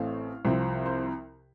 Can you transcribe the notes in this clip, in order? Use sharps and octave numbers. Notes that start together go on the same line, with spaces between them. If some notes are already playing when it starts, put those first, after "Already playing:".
Already playing: A1 A2 A3 C4 F5
C2 C3 F3 C4
C5